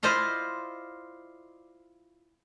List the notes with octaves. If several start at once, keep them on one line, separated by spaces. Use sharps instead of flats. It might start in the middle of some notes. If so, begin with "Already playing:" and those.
E4 F4 C5 D5 D#5 F5